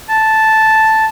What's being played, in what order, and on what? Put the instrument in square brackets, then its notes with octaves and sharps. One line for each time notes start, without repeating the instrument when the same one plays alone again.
[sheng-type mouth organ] A5